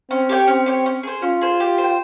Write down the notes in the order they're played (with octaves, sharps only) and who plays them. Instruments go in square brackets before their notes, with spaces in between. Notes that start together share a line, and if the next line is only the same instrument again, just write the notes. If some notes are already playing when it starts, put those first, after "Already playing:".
[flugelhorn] C4 [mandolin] C#4
[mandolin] G4 C#5 G5
[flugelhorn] C4 [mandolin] C#4
[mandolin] G4 C#5 G5
C#4
G#4 C5
[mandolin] C#4 [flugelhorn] F4
[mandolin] G#4 C5
G4
C5
G5